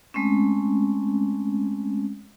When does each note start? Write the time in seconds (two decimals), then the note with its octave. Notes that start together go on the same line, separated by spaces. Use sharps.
0.14 G#3 A3 C4 C#4